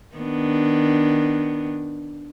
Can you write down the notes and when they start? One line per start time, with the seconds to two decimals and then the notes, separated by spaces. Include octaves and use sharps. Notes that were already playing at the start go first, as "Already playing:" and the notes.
0.16 D#3 B3 D4